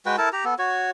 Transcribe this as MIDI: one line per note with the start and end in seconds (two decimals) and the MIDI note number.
0.06 0.16 56
0.06 0.16 66
0.06 0.16 71
0.06 0.16 79
0.18 0.29 64
0.18 0.29 69
0.18 0.29 70
0.18 0.29 81
0.33 0.45 67
0.33 0.45 82
0.45 0.54 59
0.45 0.54 69
0.59 0.91 66
0.59 0.91 73